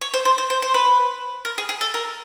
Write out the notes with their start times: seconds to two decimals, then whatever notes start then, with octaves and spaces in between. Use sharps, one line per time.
0.01 C#5
0.14 C5
0.25 C5
0.38 C5
0.50 C5
0.62 C5
0.74 B4
1.45 A#4
1.58 G#4
1.69 G#4
1.81 A4
1.94 A#4